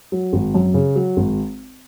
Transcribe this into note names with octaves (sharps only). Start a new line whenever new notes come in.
F#3
G#1
F#2
C#3
F#3
G#1